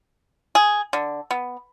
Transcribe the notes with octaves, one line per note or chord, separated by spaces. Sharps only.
G#4
D3
B3